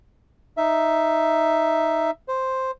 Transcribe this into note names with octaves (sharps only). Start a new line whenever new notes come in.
D#4 E5
C5